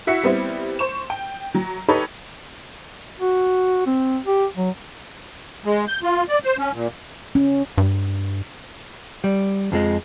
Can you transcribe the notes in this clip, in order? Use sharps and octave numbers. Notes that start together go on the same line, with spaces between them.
E4 F#4 E5 C#7
G3 B3 C4 E4
C5 C#6 E7
G5
F#3
D#4 G4 A4 B4 C#5 B5
F#4
C4
G4
F#3
G#3
G6
F4
D5
C5
C#4
A#2
C#4
G2
G3
F2 F3 G#3